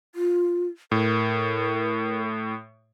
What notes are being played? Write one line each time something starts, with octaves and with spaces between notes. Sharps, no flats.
F4
A2 A#4